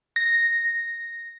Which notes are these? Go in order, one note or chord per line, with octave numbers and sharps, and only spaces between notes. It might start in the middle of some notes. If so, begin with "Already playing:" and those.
A#6